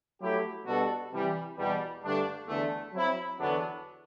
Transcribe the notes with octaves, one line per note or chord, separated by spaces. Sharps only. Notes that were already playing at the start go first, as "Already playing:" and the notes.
F#3 A3 E4 G4
B2 G3 D4 F#4 A4
C3 E3 G3
E2 B2 G3
G2 D3 A3 D4
E2 D3 A3
F#3 C4 E4
E2 D3 F#3 B3 D4